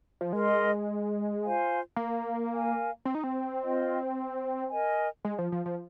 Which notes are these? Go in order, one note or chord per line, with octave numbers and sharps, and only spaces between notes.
F3
G#3 A#4 D#5 C6
F4 C5 F5 G#5
A#3
A#4 F5 G#5
C4
D#4
C4
F4 C5 D#5
A#4 D#5 G#5
G#3
F3
F3
F3